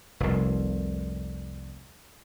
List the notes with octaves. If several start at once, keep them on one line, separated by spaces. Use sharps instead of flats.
F1 C2